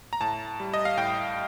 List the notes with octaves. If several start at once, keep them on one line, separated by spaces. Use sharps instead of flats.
A#5
A2 A5
G3
D#5
F5
A2 G5